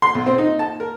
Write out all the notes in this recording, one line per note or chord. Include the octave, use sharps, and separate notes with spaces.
C6
B1
C4
D#4
A5
A#4